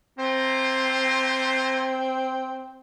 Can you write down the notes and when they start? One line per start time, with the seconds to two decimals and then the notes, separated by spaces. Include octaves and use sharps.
0.19 A3 A#3 C4 C5